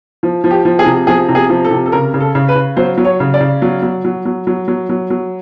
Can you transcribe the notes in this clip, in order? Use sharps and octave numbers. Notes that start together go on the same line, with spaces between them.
F3
F3
G4
F3
G#4
C3
F3 G#4
C3
G#4
F3
A4
C3
A4
C#3 A#4
C#3
A4
C#3
B4
C#3
F#3 C5
F#3
C#5
C#3
D5
C#3
F#3
F#3
F#3
F#3
F#3
F#3
F#3
F#3